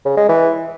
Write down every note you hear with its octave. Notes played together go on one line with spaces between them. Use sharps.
C#3
G#3
E3